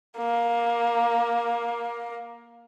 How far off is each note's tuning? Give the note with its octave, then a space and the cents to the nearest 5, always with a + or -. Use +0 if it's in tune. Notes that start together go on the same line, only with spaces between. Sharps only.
A#3 +15